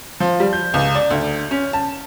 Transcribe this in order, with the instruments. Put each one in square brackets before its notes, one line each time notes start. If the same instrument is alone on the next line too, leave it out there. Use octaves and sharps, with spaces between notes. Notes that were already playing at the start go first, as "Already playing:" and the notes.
[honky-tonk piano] F3
G3
G6
C#2
D5
D2
C#4
A5